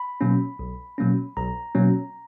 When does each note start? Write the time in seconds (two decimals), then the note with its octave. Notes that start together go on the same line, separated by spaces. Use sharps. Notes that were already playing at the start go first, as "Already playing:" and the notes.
Already playing: B5
0.21 B2 F#3 A#3 C#4
0.59 B1
0.98 B2 F#3 A#3 C#4
1.36 B1 A#5
1.75 B2 F#3 A#3 C#4